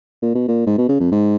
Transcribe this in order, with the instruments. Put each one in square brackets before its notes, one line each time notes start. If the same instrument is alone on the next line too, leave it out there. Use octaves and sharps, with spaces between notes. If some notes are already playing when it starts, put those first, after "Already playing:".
[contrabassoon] A#2
B2
A#2
G#2
B2
C#3
F2
G#2